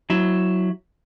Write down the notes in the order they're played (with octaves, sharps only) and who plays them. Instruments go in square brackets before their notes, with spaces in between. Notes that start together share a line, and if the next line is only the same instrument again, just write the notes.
[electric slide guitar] F#3 E4